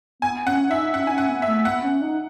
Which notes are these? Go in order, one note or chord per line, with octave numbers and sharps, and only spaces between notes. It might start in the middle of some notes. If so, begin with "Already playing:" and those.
B3 G#5
C#4 F#5
D#4 E5
C#4 F#5
C#4 D#4 G#5
F#5
B3
E5
A3
B3 F#5
C#4
D#4